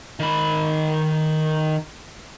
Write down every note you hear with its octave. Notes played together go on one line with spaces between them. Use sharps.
D#3 B5